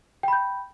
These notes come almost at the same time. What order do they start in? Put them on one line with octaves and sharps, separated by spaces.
G5 B5 G6